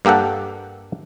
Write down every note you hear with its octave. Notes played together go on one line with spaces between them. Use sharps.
G2 A#3 G4 A4 F#5